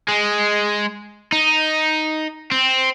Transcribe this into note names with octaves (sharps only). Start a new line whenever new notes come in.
G#3
D#4
C4